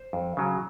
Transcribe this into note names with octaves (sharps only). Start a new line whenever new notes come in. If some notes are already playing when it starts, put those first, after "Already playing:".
Already playing: C5
F2
C#3 F#3